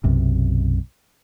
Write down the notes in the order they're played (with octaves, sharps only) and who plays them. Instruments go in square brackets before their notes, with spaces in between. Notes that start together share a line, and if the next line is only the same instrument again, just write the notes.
[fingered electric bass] B1 F#2 C3